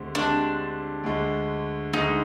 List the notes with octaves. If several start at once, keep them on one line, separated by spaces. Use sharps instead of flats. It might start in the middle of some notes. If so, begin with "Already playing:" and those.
Already playing: D2 D3 G#3 C4 G4
D2 D3 G#3 C4 D4 G4
D2 D3 G#3
D2 D3 G#3 D#4